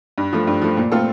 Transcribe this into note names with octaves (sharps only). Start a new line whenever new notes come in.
G2
F3 A3
G2
F3 A3
A#2
A3 C4 F4 A4